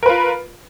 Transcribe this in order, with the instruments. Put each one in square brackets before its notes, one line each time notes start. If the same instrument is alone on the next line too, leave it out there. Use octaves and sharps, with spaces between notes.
[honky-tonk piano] A#4
B4
F4